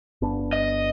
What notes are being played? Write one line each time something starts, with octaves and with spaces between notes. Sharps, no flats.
G1 B3 D4
D#5